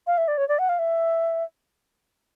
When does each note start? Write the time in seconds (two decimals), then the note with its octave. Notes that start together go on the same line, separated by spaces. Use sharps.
0.07 F5
0.18 E5
0.28 D5
0.38 C#5
0.49 D5
0.59 F#5
0.69 F5
0.79 E5